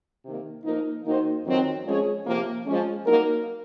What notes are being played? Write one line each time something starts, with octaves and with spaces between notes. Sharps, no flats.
C3 D#3 A#3
F3 A#3 D#4 A#4
D#3 A#3 D#4 F#4 C5
F2 D#3 F#3 C4 D#4
F3 G#3 C#4 G#4 C#5
C3 F3 A#3
F3 G#3 C#4
F#3 A#3 D#4 A#4